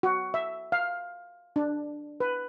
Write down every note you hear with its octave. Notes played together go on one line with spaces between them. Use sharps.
F#4
E5
F5
D4
B4